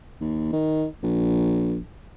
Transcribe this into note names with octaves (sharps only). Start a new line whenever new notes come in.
D#2
D#3
A#1